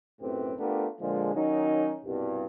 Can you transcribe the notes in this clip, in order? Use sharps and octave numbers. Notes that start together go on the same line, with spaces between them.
B1 F#2 A2 C4 G4 B4
A3 B3 D4 F4 G4 A#4
A#2 D3 F3 G#3
D#3 F#3 C#4 D#4
C2 G2 B2